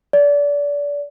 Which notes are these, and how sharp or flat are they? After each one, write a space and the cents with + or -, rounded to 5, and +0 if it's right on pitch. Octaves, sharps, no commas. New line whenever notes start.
D5 -30